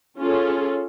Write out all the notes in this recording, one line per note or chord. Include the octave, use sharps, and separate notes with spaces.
C#4 F4 G#4 A4